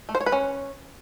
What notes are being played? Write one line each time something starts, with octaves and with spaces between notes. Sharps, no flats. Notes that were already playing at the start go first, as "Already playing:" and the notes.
A3
C5
C#5
B4
C#4